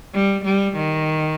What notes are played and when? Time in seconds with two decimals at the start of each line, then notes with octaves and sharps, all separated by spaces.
0.14 G3
0.45 G3
0.76 D#3